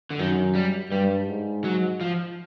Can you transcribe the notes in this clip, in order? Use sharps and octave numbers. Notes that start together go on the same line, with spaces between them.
D3
F#2 D#3
G3
G2 G3
G#2
F#3
F3